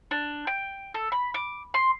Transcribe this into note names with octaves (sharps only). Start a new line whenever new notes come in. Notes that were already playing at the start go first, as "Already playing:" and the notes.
D4
G5
A4
B5
D6
C6